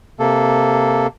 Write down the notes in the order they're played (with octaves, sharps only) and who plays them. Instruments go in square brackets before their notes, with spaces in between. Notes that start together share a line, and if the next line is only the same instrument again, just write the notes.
[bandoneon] C3 A#3 A4